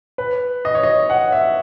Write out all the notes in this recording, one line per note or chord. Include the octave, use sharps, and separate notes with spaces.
B4
D#5
C#5
D#5
F#5
E5